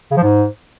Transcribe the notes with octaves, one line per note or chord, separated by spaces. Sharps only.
C#3
F3
G#2